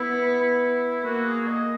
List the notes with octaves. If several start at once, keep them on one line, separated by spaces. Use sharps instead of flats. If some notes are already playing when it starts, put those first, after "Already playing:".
Already playing: B3 E4
E4
A#3 F#4
G#4
D#5